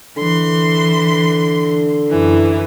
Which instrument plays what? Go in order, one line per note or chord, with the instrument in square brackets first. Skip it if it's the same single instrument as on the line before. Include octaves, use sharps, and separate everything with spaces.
[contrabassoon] D3 [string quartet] E3 C6
[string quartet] F#2 E3